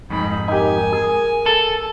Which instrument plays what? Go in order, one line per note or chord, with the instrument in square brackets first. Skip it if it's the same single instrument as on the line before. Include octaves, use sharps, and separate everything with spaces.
[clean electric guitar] F2 G#2 [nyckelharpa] D#4 B5
[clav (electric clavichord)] D#4 G4 [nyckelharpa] A#4 G#5
[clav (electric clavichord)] G#4
[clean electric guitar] A4